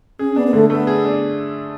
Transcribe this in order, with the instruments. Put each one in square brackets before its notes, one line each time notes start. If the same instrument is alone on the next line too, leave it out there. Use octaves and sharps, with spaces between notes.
[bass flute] C#4 [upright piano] G#4
[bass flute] B3 [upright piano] D4
[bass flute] B3
[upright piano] D3 [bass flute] A3
[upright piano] A3 [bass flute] B3
[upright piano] G#4
D4